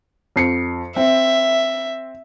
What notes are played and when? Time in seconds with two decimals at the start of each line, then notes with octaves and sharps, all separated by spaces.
0.36 F2 C7 C#7
0.96 C4 E5